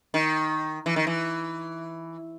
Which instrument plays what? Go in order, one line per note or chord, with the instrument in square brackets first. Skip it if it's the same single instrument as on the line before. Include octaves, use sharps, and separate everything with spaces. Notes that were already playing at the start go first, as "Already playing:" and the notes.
[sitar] D#3
E3
D#3
E3